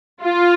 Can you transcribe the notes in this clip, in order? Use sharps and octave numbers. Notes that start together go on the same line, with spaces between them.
F4